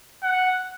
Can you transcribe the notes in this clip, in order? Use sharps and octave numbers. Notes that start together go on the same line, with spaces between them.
F#5